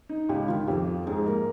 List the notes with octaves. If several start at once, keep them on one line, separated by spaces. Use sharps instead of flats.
D#4
C#2 G4
D#3 F4
F2 G4
F3
G#2 G#4
A#3 A#4